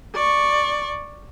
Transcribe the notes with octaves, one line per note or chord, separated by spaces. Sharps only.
D5 C#6